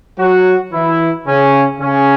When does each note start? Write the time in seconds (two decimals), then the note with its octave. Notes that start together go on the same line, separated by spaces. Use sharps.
0.19 F#3 F#4
0.72 E3 E4
1.27 C#3 C#4
1.81 C#3 C#4